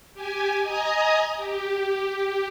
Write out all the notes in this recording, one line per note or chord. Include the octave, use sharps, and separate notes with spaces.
G4 G#5
D#5 G#5 A#5 D#6
G4